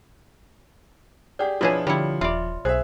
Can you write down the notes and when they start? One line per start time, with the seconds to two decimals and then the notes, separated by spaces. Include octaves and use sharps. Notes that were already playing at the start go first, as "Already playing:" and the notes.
1.39 G4 G#4 D5 F#5
1.61 B2 F3 D4 E4 F4 G#4 B4 C#5
1.87 D3 F3 G3 E4 C#7
2.21 D#1 F4 D5 E5 B5
2.65 B1 G#4 C5 E5